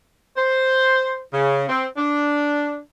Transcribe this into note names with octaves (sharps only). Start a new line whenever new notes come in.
C5
C#3
C4
D4